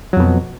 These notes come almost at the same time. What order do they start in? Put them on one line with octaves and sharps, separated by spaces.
F#3 F2 B2